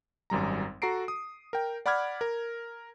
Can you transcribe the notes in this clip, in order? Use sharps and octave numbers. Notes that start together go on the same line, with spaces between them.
G#1 F#2 G3 A#5
F#4 A4 A#5 C7 D7
D#6
A#4 G5
D5 F#5 B5 D6 F6 G#6
A#4